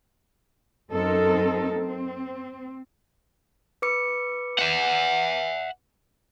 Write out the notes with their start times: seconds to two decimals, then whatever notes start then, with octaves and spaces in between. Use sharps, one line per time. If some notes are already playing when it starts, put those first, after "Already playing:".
0.91 F#2 C4 D#4 A4 A#4
1.74 C4
3.82 B4 D6 C#7
4.59 E5 F#5